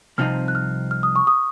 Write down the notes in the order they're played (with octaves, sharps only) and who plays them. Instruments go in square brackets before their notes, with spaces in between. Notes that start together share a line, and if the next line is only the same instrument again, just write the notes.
[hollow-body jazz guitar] C2 C3 F3 C4 D#4 [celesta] F6
[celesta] F#6
F6
F6
D#6
C#6
D#6